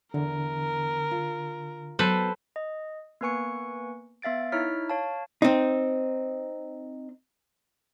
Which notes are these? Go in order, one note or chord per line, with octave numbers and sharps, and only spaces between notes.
E2 D3 A#4
F4
F#3 B3 A4 B4 C5 A5
D#5
A#3 B3 B4 G#5 C#6 C#7
B3 E5 F5 A6 D7
D#4 E4 C#5 F6 B6
C#5 F5 A5
C4 D#4